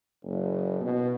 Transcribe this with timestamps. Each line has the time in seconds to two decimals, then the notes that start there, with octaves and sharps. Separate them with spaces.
0.24 F#1
0.80 B2